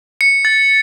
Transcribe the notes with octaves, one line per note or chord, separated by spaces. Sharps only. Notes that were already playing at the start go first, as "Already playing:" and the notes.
C#7
A6